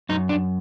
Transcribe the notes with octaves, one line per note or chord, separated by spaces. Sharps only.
F#2 D#4
D4